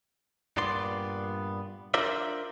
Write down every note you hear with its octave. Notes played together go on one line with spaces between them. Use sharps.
G2 A#2 B3 D5 C6
D4 F4 A#4 C5 D5 E5